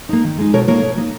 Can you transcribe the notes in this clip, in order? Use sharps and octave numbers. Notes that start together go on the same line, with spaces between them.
A#3 D#4
D#3
G#3 D#4
B2 A#4 C#5
A#3 D#4 A#4 C#5
B2
A#3 D#4